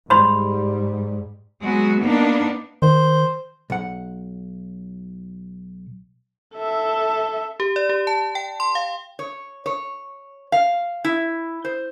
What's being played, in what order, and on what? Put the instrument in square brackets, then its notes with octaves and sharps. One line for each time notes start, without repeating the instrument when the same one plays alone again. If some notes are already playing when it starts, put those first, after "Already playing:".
[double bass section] G#2 G3 [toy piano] B5 C6
[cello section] F#3 G#3 B3 F#4
A#3 B3 D4 D#4
[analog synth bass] D#3 [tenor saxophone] C5
[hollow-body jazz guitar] B1 F#5
[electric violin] A4 E5
[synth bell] G4
D5
G4
A5
G5
C6
F5
[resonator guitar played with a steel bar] C#5
C#5
F5
E4
C5